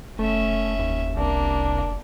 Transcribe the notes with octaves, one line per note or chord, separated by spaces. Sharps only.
F1 A3 C#4 E5
D#2
C2 A#3 D4